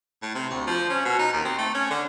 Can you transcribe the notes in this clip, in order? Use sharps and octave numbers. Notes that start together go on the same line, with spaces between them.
A2
C3
D2
F3
C#4
B2
D#4
D#2
C4
A3
C#4
D3